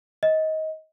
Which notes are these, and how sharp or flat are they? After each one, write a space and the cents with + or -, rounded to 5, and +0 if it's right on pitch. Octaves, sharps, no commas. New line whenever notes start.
D#5 +20